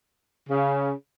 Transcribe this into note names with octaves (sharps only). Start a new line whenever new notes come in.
C#3